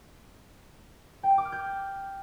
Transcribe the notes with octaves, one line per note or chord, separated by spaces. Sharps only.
G5
G6
D6
F6
G6